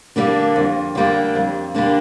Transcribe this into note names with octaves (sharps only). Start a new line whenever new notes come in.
D3 G3 A#3 D4
F2
D3 G3 A#3 D4
F2
D3 G3 A#3 D4